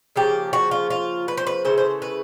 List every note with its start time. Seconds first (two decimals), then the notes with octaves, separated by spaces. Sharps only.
0.16 C#3 F3 A#3 G4
0.53 F#4
0.71 F4
0.90 F4
1.28 B4
1.37 C5
1.47 B4
1.65 C#3 E3 A3 C5
1.78 C5
2.02 B4